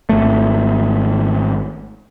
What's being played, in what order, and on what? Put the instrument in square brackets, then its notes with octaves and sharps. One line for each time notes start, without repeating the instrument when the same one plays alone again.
[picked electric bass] G#1 A3